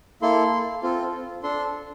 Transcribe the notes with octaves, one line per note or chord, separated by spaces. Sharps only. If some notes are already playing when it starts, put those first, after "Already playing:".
A#3 E4 A4 C6
C4 F4 A4
D4 A4 C6